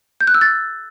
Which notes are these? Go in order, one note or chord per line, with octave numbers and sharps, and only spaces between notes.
G6
F#6
E6
A6